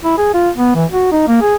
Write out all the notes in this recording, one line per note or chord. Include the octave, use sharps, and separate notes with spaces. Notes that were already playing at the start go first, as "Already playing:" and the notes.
E4
G#4
F4
B3
E3
F#4
D#4
A#3
G#4